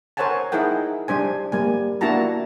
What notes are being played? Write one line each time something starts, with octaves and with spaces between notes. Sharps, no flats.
A#4 C5 C#5 F#5 G#5 A5
D#4 E4 G#4 A#4 F#5 G5
G3 D4 C5 G#5
G3 A#3 G#5
A#3 D4 E4 F#4 A5 A#5